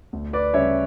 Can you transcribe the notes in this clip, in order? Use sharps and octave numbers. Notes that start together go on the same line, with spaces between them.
D2
B4 D5
C#3 G3 C#4 C#5 E5